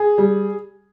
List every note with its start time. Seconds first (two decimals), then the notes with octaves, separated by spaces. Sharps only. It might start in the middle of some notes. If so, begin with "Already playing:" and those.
Already playing: G#4
0.18 G3